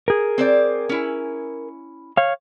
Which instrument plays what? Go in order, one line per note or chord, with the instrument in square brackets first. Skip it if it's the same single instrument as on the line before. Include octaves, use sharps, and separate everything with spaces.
[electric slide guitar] G#4 A#4
[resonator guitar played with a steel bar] C4 C5 D5
C#4 E4
[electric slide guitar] C#5 F5